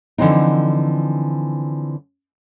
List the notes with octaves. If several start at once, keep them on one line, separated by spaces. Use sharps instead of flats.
D3 E3 F3 C4 D#4